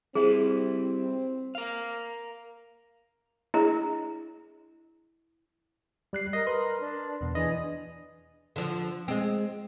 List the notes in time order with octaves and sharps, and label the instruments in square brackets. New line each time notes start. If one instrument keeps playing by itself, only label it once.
[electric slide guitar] G3 E4 [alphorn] C4 [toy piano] G#4
[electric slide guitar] A#4 F5
[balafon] D4 G#4 D#5 [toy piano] E4
[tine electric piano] G3 F#6 C7
[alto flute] A#4 [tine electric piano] D#5
[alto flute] A#4 [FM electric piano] B4 [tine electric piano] C6
[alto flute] D4
[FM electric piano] E2 B2
[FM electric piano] E3 D4 B4 [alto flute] G#4 [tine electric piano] D#5
[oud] D3 F3
G#3 C4